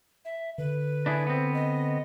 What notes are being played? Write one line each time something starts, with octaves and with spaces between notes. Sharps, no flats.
E5
D3 B4
D4 E4 G#4
B3 C4
D#5